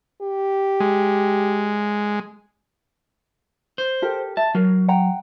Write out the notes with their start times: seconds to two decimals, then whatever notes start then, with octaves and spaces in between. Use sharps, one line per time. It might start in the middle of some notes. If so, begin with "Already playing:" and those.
0.22 G4
0.80 G#3
3.78 C5
4.02 G4 A4 A#4
4.37 E5 A5
4.55 F#3 A#4
4.88 F#5 G5 A#5